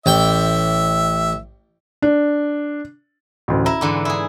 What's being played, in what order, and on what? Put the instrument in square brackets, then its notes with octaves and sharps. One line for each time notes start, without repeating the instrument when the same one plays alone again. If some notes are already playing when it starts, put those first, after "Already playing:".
[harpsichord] A1 G5 [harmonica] E5
[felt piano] D4
A1 D2
[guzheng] E4 [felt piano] A#5
[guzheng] G#2 D3 E3
E4 G#4